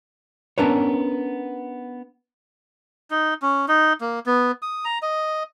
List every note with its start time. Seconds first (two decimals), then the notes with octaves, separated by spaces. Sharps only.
0.58 B3 C#4 D4 A#4 B4 C#5
3.11 D#4
3.42 C#4
3.68 D#4
4.01 A#3
4.26 B3
4.62 D#6
4.85 A#5
5.02 D#5